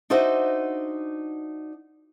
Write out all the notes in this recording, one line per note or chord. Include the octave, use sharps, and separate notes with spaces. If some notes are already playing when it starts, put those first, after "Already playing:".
D4 D#4 F#4 C5 D#5 E5